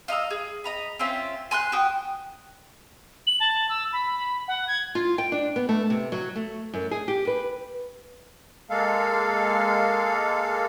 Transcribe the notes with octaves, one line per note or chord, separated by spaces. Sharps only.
F4 D#5 A#5 E6
G#4
D#5 A#5 B5
C4 C#4 F4 E5
G#5 C6 E6 F#6
F#4 G5 D#6
F#7
A5
E6
B5
F#5
G#6
F4
G5
D4
B3
A3
C3
F#3
A3
F#2
G#4
G4
B4
G#3 A#3 A4 F5